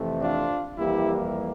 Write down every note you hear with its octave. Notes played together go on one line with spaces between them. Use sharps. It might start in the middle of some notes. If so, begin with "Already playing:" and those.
Already playing: F2 C3 E3 A3 C4
D4 F4
F2 E3 G3 A#3 E4 G4